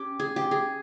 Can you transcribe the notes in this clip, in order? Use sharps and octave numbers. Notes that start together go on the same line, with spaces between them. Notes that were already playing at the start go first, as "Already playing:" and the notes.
Already playing: C#4 G4
G#4
G4
G#4